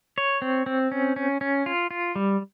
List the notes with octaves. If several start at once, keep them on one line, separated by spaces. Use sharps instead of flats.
C#5
C4
C4
C#4
C#4
C#4
F4
F4
G3